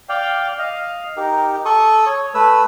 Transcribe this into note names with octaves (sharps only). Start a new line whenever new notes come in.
D5 F5 G5
D#5 F5
D#4 G4 A#4
A4 C#6 D#6
C#5
A3 B4 E6